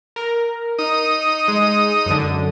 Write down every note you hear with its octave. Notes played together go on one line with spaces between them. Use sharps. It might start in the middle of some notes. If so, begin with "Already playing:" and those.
A#4
D#4 D#6
G#3
F#2 D3